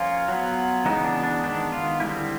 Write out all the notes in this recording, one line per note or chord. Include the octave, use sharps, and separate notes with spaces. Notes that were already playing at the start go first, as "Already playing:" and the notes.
Already playing: F3 A#3 C#4 F4
F#3 B3
C#3 E3 G#3 B3 D#4
D4
D4
D#3 G#3 B3 D4
F4
D3 G3 C4 E4